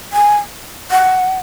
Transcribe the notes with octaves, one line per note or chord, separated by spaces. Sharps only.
G#5
F#5